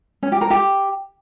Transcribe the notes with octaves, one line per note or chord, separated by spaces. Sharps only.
C#4
G4
A#4
G4